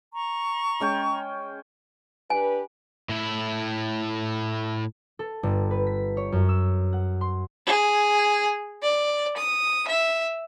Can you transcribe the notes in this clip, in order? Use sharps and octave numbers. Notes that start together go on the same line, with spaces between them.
A#5 C#6
G#3 C#4 G5
D4 G4 B4 G#5
A2 E4
A4
G1
B4
B6
C#5
F#2
E6
F#5
C6
G#4
D5
D#6
E5